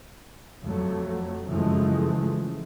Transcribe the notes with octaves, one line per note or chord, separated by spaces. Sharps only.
F2 F#3 A3
F#2 C#3 E3 F3 G#3 A3